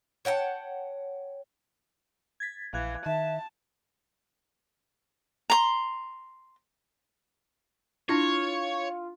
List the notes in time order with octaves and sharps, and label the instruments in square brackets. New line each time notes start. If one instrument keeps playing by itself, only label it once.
[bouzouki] C#5 F#5 G5 A5
[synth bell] G#6 A6 B6
[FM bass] A#1 [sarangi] E3 [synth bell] F5 F#6 G#6
[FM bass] D#3 [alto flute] E5 [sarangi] A5
[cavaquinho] A#5 C6
[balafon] D4 E4 [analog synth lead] F4 [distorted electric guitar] C#5